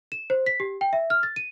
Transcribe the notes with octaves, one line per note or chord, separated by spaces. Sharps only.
E7
C5
B6
G4
G5
E5
F6
A6
D#7